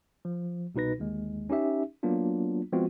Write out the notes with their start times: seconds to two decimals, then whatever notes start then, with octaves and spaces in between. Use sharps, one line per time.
0.25 F3
0.75 C2 B2 D#4 B4 A#6
0.98 G1 D#2 G#3
1.50 C#4 D#4 G4 E5
2.03 F#3 A#3 B3 D4 F4
2.72 F3 G#3 B3 C4 F4 F#4